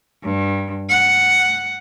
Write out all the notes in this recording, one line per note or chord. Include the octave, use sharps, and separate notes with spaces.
G2
F#5